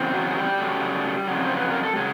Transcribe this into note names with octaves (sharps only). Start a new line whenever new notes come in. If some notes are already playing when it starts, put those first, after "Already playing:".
Already playing: E2 C#3 C4
F#3 F#4
G#4
G3 G4
C#3 F#3 A3
F2 C#3 F#3
C5
B4
A#4
A4
C#3 F#3 G#3 G#4